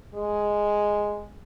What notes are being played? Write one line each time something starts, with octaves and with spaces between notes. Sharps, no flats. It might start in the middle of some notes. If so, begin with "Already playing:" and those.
G#3